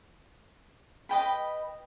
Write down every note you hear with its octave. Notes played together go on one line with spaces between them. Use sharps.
B4 D#5 G5 B5